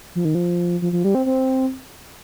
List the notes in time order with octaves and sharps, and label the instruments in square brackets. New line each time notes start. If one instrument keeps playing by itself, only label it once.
[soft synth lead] F3
D#3
F3
F3
F3
G3
C4
C4